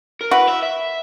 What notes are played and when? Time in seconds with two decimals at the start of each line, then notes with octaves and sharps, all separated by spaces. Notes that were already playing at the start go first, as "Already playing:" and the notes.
0.21 A#4
0.31 E4 F#4 B4
0.47 E5
0.63 E5